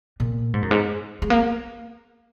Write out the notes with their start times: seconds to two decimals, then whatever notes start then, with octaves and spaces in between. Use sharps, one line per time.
0.20 A#2
0.54 G#2
0.62 F#2
0.71 G#2
1.22 G#3
1.30 A#3